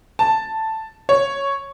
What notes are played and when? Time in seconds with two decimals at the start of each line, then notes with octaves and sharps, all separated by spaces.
0.19 A5
1.09 C#5